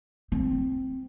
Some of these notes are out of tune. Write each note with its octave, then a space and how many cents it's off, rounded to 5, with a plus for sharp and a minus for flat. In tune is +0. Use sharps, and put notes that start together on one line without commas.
C4 -5